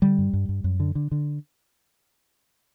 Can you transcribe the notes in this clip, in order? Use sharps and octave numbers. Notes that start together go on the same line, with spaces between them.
D3 G3
G2
G2
G2
F#2
D3
D3
D3